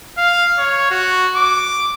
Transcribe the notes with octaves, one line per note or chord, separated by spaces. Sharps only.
F5
C#5
F#4
D6